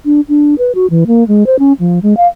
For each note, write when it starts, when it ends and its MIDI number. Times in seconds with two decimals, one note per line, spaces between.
0.05 0.20 62
0.28 0.55 62
0.58 0.72 71
0.75 0.87 66
0.90 1.04 52
1.07 1.27 58
1.28 1.46 56
1.46 1.59 72
1.59 1.73 61
1.79 1.99 53
2.02 2.16 56
2.17 2.27 77